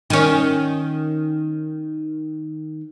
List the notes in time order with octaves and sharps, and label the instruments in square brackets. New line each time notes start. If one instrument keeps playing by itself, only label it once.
[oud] D#3 C#4